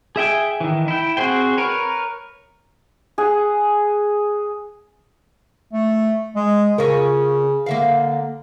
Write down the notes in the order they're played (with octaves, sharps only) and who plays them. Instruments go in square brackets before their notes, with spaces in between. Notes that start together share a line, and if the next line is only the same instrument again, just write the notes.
[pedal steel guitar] G#4 E5 G5 G#5
D#3 E3
E4 G5
C4 F#4 G#4 C5 G5
A#4 B4 C#5
[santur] G#4 F#5
[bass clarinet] A3
G#3
[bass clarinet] C#3 [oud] C#4 F4 A#4
[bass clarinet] D3 [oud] A#3 E5 F5